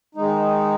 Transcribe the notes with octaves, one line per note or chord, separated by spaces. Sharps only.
D#3 G#3 D#4